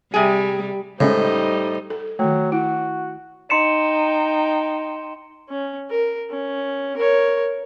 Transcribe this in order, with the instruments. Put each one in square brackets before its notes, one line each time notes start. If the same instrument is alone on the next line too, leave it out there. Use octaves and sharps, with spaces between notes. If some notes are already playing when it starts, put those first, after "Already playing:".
[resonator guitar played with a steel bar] C3 G#4 [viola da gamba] G3
[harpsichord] A2 [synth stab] C#3 G#3 C#4 [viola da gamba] G3 D#4 [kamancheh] C5 D#5
[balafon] A4
[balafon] D#3 A3 [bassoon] F#3
[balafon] E4 [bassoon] F#4
[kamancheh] D#4 G5 [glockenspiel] C6 C#7 E7
[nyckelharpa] C#4
A#4
C#4
A#4 C#5